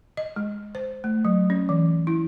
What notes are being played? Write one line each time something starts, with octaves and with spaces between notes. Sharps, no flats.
D#5
G#3
C5
A3
F#3
C#4
E3
E4